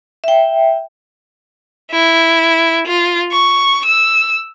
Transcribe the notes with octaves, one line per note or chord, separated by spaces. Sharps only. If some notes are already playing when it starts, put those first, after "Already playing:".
E5 G5
E4
F4
C#6
E6